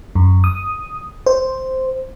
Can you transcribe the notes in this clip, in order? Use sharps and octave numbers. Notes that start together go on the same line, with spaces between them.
F#2
D#6
C5